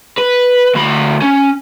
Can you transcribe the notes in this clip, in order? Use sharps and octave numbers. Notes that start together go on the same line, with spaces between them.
B4
D2 B5
C#4